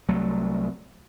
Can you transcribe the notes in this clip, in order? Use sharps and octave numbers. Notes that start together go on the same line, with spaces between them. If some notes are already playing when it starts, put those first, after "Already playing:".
C2 F#3 A3